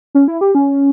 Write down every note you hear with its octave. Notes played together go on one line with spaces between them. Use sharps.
C#4
E4
G4
C#4